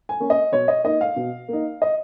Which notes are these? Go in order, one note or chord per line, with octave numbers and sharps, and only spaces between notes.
G#5
A#3 C#4
D#5
B2 C#5
D#5
A#3 D#4 D#5
F5
B2
A#3 D#4
D#5